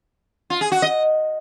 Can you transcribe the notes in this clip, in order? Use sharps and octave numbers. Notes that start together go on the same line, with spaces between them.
F4
G#4
F#4
D#5